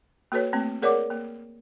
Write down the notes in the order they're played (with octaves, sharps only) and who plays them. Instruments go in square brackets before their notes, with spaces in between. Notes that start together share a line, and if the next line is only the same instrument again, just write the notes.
[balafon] A#3 F#4 A4 B4 C#5
A3 A#3 C4
G#4 A#4 C#5 D5 F#5 D6
A#3